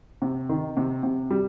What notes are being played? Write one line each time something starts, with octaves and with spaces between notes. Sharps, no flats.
C3
D#3
C3
C3
G3